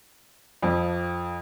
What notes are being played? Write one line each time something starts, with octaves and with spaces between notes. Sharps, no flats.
F2 F3